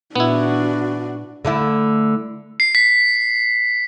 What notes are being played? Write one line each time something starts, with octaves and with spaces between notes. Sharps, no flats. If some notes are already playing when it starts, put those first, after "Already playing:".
A#2 B3 D4 E4 F#4
D3 A3 E4
C7
B6